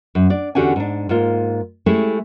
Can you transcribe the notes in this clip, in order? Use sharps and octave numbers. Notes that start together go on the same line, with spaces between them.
F#2
D4 D5
E2 D3 C#4 F#4 G4 G#5
G#2 D4
G#2 A#3 F4
G#3 A3 C#4 E4 G4 G#4